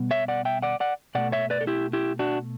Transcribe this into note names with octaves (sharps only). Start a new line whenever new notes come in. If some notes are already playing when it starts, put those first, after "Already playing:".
Already playing: B2 G3 B3
C#5 E5
D5 F#5
E5 G5
D5 F#5
D5 F#5
B2 A3 D5 F#5
C#5 E5
B4 D5
A4
E4 G4
E4 G4
D4 F#4